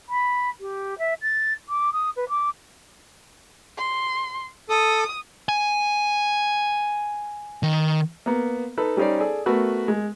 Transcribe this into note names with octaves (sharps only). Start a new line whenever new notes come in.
B5
G4
E5
A6
D6
D#6
B4
D6
C6
A4 D#6
G#5
D#3
A#3 B3
D#4 A4 B4
G3 C#4 D#4 C5 D5
G#4 A4 D5
A3 B3 F#4 A#4 B4
G#3